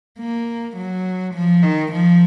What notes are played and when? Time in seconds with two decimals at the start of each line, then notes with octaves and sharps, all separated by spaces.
0.19 A#3
0.76 F#3
1.34 F3
1.63 D#3
1.92 F3